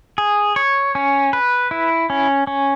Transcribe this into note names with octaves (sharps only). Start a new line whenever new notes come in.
G#4
C#5
C#4
B4
E4
C#4
C#4